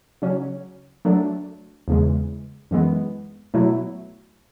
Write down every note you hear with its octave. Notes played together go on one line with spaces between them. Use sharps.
C#3 F#3 C#4
F#3 A3 D4
E2 C#3 E3 G#3
F#2 E3 G#3 B3
B2 F#3 A3 E4